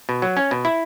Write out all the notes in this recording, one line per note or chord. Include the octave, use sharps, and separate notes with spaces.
B2
F#3
C#4
B2
E4